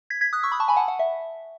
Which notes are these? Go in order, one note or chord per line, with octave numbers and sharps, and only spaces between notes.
G#6 B6
G#6 B6
D#6 F#6
C#6 E6
B5 D#6
A5 C#6
G#5 B5
F#5 A5
F#5
E5